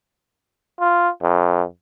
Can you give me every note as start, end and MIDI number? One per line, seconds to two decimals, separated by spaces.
0.80 1.09 65
1.22 1.63 41